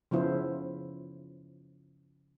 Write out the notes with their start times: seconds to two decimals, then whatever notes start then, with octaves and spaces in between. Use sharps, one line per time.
0.11 C#3 F3 B3 E4 F4 C5